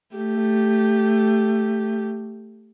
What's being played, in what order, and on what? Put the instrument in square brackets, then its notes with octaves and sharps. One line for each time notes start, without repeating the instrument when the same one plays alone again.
[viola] A3 G4